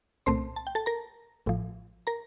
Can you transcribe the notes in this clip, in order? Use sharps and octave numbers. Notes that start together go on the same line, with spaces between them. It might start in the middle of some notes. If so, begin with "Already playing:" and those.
C2 A#2 A3 C4 C5 C6
A5
G5
A4 A5
A#4 A#5
A1 A2 F3
A#4 A#5